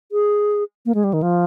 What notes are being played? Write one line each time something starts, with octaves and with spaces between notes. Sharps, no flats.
G#4
A#3
G#3
G3
D#3
F3